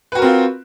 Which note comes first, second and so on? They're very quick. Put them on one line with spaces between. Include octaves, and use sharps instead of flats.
B4 F#4 A#4 C4 F4